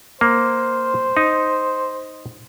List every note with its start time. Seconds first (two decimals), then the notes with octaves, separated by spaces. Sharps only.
0.21 A#3 C5
1.17 D#4